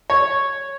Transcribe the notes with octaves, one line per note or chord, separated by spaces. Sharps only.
C#5